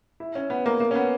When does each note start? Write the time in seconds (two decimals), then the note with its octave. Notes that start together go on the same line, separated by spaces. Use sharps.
0.20 E4
0.35 C#4
0.50 B3
0.66 A#3
0.80 A#3
0.91 C#4
0.95 B3